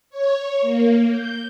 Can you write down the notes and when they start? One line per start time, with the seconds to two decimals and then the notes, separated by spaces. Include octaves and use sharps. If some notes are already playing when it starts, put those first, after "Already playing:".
0.10 C#5
0.61 A#3
1.10 G6